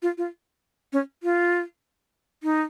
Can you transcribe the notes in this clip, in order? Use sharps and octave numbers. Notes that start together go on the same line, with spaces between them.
F4
F4
C#4
F4
D#4